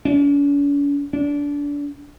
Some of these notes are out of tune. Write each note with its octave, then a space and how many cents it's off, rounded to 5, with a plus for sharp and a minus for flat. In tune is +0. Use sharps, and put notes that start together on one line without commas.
C#4 +45
D4 -25